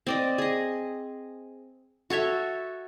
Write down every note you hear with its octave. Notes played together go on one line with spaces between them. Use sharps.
C4 D5 D#5
G#4 D#5
F#4 A4 C#5 E5